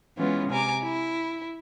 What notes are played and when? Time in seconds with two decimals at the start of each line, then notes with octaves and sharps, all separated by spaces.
0.17 E3 G#3 B3 C#4 F4
0.49 C3 G#5 A#5 D6
0.83 E4